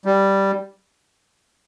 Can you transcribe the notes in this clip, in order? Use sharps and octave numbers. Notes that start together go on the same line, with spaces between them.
G3